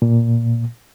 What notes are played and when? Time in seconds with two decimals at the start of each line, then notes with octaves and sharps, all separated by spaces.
0.02 A#2